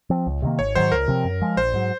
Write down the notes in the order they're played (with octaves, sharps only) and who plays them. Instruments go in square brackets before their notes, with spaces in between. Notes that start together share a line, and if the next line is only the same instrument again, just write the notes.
[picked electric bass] F3 C4
C#2
C3 D#3 A#3
[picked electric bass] G#1 [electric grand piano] C#5
[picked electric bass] G#2 D#3 F#3 [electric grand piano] C5
[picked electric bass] C#2 [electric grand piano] A#4
[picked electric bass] C3 F3 C4
F#2
F3 G#3
[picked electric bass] A#1 [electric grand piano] C5
[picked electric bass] G#2 F#3